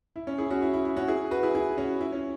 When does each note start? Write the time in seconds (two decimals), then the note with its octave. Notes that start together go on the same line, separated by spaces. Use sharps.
0.16 E4
0.27 C#4
0.38 E4 G#4
0.50 C#4 F#4
0.62 E4
0.74 E4
0.85 E4
0.97 C#4 F#4
1.08 E4 G#4
1.31 F#4 B4
1.43 E4 G#4
1.55 E4 G#4
1.78 C#4 F#4
2.01 E4
2.13 C#4